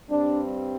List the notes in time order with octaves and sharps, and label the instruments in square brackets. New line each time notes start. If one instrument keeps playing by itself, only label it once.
[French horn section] G2 G3 C4 D4